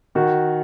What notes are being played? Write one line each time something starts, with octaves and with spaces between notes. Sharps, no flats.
D#3 F#4